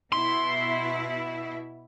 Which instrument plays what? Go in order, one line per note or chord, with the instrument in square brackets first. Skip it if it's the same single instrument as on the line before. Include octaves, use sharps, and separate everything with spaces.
[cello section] B2 E4 [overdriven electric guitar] C6